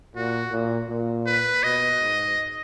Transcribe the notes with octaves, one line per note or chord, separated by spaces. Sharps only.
A#2 F#4
A#2
A#2
B4
B2 D#5
G#2